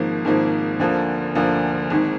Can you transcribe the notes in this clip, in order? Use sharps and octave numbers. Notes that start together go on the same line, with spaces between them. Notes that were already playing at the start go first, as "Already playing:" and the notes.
Already playing: G#1 G#2 F3 A#3
G#1 G#2 F3 A#3
D2 D3 F3 A#3
D2 D3 F3 A#3
G#1 G#2 D#3